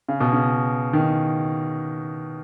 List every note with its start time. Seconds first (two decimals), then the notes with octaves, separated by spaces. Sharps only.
0.08 C#3
0.20 B2
0.33 C#3
0.93 D#3